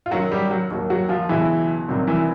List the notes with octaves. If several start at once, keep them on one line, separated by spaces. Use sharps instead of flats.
F4
F#2 D#3 F#3 F#4
G3 G4
F#3 F#4
D#2 D#3 F#3
F#3 F#4
F3 F4
C#2 B2 E3 F#3 E4
C2 C3 D#3 F#3
E3 E4